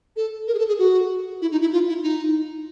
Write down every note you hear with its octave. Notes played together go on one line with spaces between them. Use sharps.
A4
A#4
G#4
A4
G#4
F#4
E4
D#4
E4
F4
E4
D#4